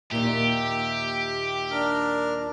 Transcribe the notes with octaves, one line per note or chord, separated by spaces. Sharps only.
D#2 A#2 G4 E5
D4 A#4 F6